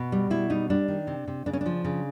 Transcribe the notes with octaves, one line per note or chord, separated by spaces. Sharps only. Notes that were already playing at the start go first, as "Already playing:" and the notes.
Already playing: B2
G3
B2 E4
G3 D#4
G3 D4
D#3
C3
C3
C#3 D4
C#4
F3 D4
C#3